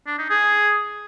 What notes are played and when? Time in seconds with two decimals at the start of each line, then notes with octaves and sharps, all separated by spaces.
0.07 D4
0.18 D#4
0.30 G#4